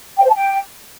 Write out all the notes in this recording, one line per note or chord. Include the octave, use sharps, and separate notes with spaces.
G5
C5
A5
G5